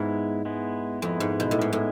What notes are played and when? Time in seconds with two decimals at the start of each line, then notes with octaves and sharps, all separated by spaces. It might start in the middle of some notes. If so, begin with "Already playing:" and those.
Already playing: G#2 G#3 B3 E4
0.45 G#3 B3 E4
1.02 F2 G#3 B3 E4
1.20 G#2
1.40 B2
1.51 A2
1.59 G#2 G#3 B3 E4
1.73 A2